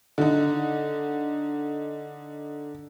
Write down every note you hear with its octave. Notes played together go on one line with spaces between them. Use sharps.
D3 D#4